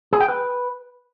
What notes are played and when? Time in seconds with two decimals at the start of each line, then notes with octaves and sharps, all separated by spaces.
0.13 G#4
0.21 G5
0.28 B4